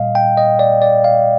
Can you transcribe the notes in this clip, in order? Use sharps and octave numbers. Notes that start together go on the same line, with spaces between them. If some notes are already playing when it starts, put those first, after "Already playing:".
Already playing: A#2 G3 D#5 F5
G5
D#5
D5
D5
F5